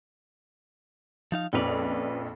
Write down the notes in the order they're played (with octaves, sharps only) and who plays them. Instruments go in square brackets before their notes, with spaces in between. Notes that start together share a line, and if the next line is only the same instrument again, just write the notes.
[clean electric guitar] F3 D#4 F5
[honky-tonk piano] A#1 F2 F7 [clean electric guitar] C#4 B4 D5